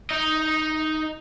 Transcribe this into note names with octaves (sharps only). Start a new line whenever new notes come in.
D#4 D#5